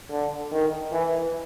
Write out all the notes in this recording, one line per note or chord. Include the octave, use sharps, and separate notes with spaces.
D3
D#3
E3